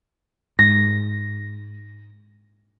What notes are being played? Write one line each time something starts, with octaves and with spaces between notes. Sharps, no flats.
G#2 A#6